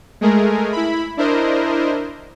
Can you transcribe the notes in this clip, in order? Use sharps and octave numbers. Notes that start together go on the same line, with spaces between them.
G#3 A3 G#4 A#4
E4 B5
D4 E4 A#4 C5 D#5